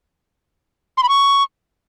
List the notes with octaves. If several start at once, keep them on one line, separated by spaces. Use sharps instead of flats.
C6
B5
C#6